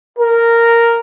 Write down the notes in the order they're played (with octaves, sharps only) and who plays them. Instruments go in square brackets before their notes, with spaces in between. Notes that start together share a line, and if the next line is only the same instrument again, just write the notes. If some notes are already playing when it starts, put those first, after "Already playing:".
[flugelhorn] A#4